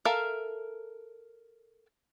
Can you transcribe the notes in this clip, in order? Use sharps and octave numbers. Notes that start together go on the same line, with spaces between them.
A4 A#4 E5 F5